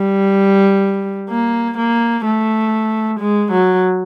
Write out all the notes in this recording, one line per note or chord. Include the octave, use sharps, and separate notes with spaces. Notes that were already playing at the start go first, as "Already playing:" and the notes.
Already playing: G3
A#3
A#3
A3
G#3
F#3